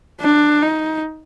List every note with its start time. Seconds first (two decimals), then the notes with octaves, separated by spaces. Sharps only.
0.21 D4
0.62 D#4